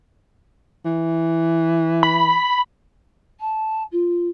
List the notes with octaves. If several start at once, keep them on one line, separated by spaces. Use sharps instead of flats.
E3
B5
A5
F4